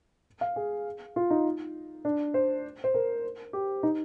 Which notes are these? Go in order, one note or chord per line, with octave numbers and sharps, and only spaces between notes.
F5
G#4
F4
D#4
D4
C5
C5
A#4
G4
D#4